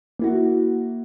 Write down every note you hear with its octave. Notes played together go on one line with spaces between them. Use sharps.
A#3 E4 F#4